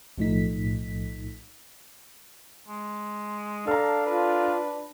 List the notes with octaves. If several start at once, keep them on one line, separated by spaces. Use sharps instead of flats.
B1 A2 F3 A3 D#4 B6
G#3
D4 A4 F5 A#5
F4 B4